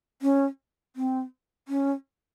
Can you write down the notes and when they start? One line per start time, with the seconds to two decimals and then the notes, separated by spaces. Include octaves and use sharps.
0.22 C#4
0.96 C4
1.68 C#4